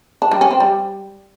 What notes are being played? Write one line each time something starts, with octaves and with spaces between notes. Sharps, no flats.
D4
G3
C#4
C4
G3